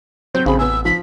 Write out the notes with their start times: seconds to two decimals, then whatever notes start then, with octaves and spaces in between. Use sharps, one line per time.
0.34 F#3 C4 G6
0.46 A1 C#3 C4 G#4 B5
0.59 B3 G#5 E6
0.85 F3 B6